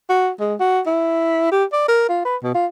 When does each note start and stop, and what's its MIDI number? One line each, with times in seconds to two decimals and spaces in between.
0.09 0.31 66
0.40 0.55 56
0.60 0.81 66
0.86 1.47 64
1.51 1.64 67
1.72 1.87 74
1.88 2.07 70
2.09 2.23 65
2.25 2.36 71
2.43 2.52 47
2.54 2.67 65